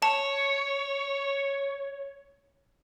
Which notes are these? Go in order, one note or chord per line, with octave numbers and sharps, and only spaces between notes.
C#5 A5